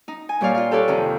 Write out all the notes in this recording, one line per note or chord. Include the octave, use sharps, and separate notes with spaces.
D#4
G#5
A#2 G3 C#5 D5 F5
F4 F5
G4 A4 B4 C#5 D5
F2 C3 D#3